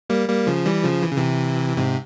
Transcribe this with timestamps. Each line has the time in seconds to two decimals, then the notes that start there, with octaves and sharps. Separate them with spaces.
0.10 G3 A#3
0.28 G3 A#3
0.47 C#3 F3
0.66 E3 G3
0.84 C#3 F3
1.03 E3
1.11 C#3
1.17 C3 E3
1.77 G#2 C3